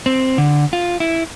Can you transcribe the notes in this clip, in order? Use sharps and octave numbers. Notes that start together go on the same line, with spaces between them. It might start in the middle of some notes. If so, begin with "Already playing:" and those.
C4
D3
F4
E4